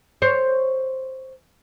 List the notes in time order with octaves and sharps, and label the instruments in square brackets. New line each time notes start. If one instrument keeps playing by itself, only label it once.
[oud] C5 C#5